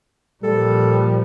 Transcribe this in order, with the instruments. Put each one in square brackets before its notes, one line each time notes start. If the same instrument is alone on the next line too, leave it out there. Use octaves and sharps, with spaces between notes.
[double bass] A#2 F3 [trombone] G3 [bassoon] A4